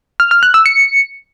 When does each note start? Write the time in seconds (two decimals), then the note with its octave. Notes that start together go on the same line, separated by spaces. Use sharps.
0.20 F6
0.31 F6
0.43 F#6
0.54 E6
0.66 C#7